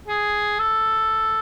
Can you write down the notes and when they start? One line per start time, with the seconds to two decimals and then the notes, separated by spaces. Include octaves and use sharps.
0.08 G#4
0.59 A4